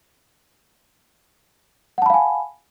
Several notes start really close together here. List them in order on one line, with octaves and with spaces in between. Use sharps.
F#5 A5 B5 F5 G#5